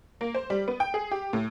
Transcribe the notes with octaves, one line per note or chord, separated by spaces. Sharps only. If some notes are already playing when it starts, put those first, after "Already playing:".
A#3
C5
G3
B3
G5
G#4
G4
A2